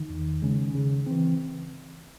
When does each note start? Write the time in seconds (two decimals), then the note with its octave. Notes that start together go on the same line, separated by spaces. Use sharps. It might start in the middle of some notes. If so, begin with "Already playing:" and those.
Already playing: D#3
0.10 E2
0.42 C#3 G#3 C#4
0.74 C#3
1.07 E3 C4